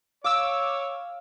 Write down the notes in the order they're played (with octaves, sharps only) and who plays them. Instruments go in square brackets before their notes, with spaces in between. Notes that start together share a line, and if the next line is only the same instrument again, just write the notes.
[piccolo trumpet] C#5 [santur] F5 [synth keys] D6 E6